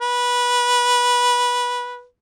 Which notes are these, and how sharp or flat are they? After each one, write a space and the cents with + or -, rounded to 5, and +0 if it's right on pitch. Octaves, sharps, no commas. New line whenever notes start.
B4 -15